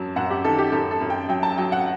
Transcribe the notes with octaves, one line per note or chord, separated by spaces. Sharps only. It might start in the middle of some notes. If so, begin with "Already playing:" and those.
Already playing: F#2 F#3 A5
F#2 F#5
G4
D#3 A4
G4
F#2 A4
A4
F#2
G5
F#3 G5
A5
F#3 G5
F#5